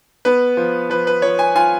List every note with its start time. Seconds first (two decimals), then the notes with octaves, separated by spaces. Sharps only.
0.25 B3 B4
0.57 F3
0.90 F3 B4
1.07 B4
1.22 F3 C#5
1.39 G#5
1.55 F4 G#5